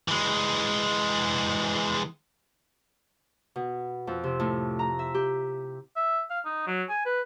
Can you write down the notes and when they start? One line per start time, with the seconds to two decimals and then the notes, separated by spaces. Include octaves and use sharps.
0.08 E3 G#3
3.56 B2
4.07 F2
4.24 C3
4.40 A2
4.79 A#5
4.99 E5
5.14 G4
5.96 E5
6.31 F5
6.45 D#4
6.67 F#3
6.89 G#5
7.06 B4